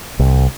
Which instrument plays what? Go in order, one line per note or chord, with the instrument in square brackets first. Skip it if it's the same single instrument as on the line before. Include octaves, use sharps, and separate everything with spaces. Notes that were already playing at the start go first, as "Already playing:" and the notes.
[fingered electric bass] C2